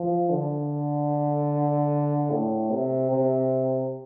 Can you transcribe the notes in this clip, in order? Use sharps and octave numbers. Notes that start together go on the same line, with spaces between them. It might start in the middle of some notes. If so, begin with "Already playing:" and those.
Already playing: F3
D3
A2
C3
C3